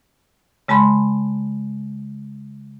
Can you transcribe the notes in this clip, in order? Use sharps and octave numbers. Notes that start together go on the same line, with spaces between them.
C#3 G#3 A5 B5 C6